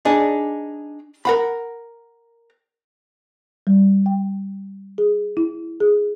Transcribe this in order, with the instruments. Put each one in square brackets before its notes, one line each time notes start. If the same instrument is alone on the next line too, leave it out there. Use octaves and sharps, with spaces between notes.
[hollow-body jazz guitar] D4 D#4 G#4
A#4 F#5 B5
[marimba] G3
G5
G#4
E4
G#4